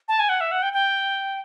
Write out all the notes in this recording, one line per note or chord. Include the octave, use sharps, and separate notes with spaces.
A5
G#5
F#5
E5
F#5
G5
G5